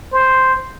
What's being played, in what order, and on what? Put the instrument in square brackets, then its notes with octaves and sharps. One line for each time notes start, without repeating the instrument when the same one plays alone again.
[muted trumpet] C5